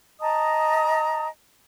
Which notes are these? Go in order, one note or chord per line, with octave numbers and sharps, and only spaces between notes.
D#5 A5 A#5 D#6